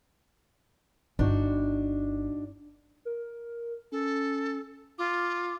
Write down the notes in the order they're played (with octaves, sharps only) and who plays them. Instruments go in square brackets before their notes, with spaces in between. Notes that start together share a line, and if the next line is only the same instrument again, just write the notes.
[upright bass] G1 [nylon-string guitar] D4 D#4 F#4
[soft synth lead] A#4
[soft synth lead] C#4 [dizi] A4
[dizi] F4 [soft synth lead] D6